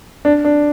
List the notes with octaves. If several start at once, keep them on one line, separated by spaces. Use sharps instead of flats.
D4
D4